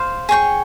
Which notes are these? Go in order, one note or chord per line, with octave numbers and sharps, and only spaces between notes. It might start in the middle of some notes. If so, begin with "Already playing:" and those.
Already playing: C5 F5
G#4 C#5 G5 C#6